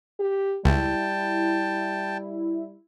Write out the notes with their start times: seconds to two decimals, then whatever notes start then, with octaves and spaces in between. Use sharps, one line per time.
0.19 G4
0.65 C#2 G3 E4 G5 A5